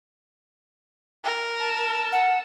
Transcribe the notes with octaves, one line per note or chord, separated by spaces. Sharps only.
A#4
A5 E6
F#5